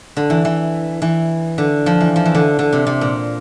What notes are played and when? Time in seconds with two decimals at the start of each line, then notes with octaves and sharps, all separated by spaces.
0.17 D3
0.30 E3
0.45 E3
1.02 E3
1.58 D3
1.86 F3
2.01 E3
2.16 F3
2.25 E3
2.35 D3
2.59 D3
2.73 C3
2.87 C3
3.01 A#2